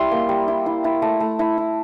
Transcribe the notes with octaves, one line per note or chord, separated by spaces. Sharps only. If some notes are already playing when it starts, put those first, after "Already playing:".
Already playing: G3 E4 C6
A#3
G3
E4
E4
E4
A3
A3
E4
E4